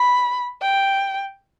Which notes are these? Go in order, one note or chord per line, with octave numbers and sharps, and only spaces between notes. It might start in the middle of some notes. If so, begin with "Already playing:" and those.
Already playing: B5
G5